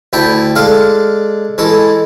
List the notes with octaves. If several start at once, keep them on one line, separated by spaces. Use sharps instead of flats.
D2 E4 G5 A5
G#3 D4 A4 F5
E3 G#3 A4